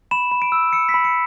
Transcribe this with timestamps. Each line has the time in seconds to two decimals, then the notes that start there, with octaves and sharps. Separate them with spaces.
0.11 B5 E7
0.31 B5
0.42 D7
0.52 E6
0.73 E6 C#7
0.89 B6
0.94 B5
1.05 C#7